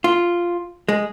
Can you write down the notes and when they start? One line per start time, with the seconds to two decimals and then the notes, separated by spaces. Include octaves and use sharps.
0.04 F4
0.89 G#3